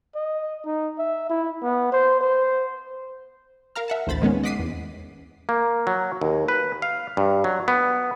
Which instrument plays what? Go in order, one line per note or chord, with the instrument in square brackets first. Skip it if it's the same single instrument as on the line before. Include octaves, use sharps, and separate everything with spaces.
[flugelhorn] D#5
D#4
E5
E4
B3
C5
C5
[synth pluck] A#4 F5 A#5 F6
E5 F#5 A5
A1 D2 C5 B5 A6
D#3 G#3 B3 C#4
D#5 F#5 D6 B6 C7 D#7
E2
[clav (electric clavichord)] A#3
F#3
D#2
B4
F5
G2
F#3
B3